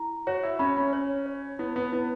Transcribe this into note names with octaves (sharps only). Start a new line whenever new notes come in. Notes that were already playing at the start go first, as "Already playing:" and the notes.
Already playing: E4 A#5
F#4 C#5
E4
C#4 B5
C#4
C#5
C#5
B3 E4
B3
B3 E4